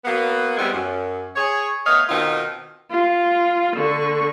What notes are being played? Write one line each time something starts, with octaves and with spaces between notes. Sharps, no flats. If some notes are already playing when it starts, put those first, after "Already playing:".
F#3 A#3 B3
E2 G3 G#3 B3 C4
F#2
G#4 C#5
A3 B3 C#5 D#5 F5
B2 D#3 C4 D#4 F4
F4
D3 C#6